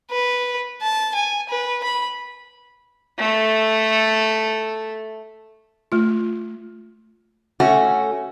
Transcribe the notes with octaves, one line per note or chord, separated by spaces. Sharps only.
B4
A5
G#5
B4
B5
A3 A4
A3 F4
A3 C#4 F#4